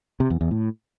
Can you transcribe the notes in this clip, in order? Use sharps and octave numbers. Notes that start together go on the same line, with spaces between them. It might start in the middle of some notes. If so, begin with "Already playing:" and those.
C3
E2
E2
A2